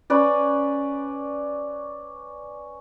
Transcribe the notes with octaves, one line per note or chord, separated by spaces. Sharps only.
C#4 B4 D5